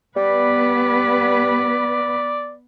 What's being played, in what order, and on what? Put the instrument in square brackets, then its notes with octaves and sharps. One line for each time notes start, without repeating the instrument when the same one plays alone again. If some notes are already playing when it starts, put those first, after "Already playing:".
[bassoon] G3 [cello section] B3 B4 [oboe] D5